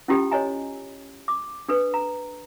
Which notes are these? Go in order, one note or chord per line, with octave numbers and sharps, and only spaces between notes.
C#4 E4 F4 G4 A4 G5
C5 C#5 D#5 G#5 A#5
D6
D4 A4 B4
A#5